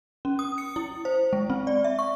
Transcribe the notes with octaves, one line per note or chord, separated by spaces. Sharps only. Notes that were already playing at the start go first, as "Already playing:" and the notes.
C#4
D#6
C#7
E4
C5
G#3
C4
D5
E5
C#6